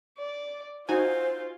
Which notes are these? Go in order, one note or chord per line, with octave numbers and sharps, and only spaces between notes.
D5
D#4 F4 F#4 C5 G#5